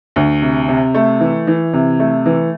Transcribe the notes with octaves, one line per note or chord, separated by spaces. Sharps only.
D2
C3
C3
A3
E3
E3
C3
A3
E3